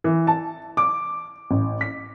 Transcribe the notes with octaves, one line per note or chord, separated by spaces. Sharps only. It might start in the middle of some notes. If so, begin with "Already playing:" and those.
E3
A5
D6
A1
B6